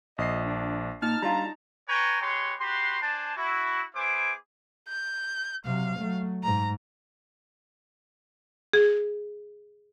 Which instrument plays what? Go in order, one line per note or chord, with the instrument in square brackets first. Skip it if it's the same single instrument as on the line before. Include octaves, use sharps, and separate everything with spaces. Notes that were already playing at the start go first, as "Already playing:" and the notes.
[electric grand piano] A#1 C7 [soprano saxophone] D#5
[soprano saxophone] D4
[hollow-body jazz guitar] A#2 [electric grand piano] D#4 [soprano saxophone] A5 [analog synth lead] F6
[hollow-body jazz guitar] G3 D4 F4 [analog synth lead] A#5
[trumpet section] B4 C#5 G5 G#5 A#5 C#6
G#3 G4 B4 C#5 C6
F#4 G4 B4 C6
D4 C5 G#5 A5
E4 F#4
B3 E4 G#4 C5 G#5 D6
[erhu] G6
[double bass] C3 F#3 [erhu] F5
[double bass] F#3 A3
[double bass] G#2 [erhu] A#5
[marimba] G#4